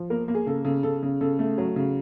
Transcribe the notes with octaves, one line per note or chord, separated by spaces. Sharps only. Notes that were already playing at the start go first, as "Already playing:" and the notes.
Already playing: F3
A#3 A#4
A#3
G#4
C#3 A4
C#3 A4
C#3 A4
C#3
C#3 A4
A3
F#3
C#3